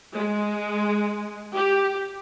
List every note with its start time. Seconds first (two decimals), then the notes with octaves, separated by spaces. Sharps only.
0.15 G#3
1.53 G4